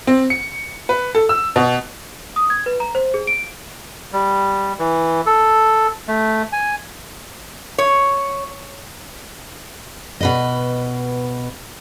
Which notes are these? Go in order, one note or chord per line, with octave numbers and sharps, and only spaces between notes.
C4
C#7
B4
A4
E6
B2
D#6
G#6
B4
A#5
C5
G#4
D7
G3
E3
A4
A3
G#5
C#5
B2 B4 D#5